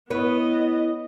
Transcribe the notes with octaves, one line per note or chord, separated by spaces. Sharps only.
B3 E4 B4 C#5 D#5